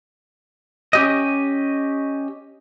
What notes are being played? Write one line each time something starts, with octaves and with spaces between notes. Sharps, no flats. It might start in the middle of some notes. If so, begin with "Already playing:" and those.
C#4 G4 D#5